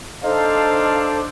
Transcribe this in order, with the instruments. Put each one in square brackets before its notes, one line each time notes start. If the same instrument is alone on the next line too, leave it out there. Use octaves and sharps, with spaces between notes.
[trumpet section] D4 C5 [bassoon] D#4 [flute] A4 [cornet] F5